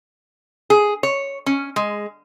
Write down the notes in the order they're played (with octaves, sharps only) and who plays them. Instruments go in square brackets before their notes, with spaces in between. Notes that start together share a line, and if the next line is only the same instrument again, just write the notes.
[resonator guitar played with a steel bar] G#4
C#5
C#4
G#3